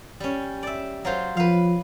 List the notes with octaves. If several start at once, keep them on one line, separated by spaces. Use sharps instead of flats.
G3 C#4
D5 E5
F#3 F4 C5
F3 B4 F5